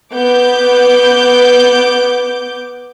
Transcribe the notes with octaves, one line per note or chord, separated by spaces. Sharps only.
B3 D6 G6